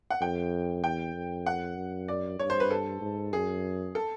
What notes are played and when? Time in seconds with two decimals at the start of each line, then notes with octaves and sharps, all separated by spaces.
0.10 F#5
0.21 F2 G5
0.83 E2 G5
1.15 F2
1.46 F#5
1.77 F#2
2.08 D5
2.39 G2 C#5
2.50 C5
2.60 B4
2.71 A4
3.01 G#2
3.33 F#2 G#4
3.95 A4